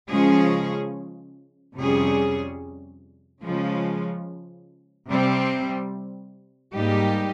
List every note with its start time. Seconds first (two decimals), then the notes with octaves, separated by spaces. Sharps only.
0.10 C#3 F3 G#3 C#4 G#4
1.77 F2 C3 G3 C#4 G#4
3.42 C#3 F3 G#3
5.08 C3 G3 C4
6.75 G#2 G3 A#3 D#4 G4